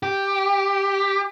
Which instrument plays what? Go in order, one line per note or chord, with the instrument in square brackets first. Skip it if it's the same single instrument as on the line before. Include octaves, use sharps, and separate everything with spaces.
[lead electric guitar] G4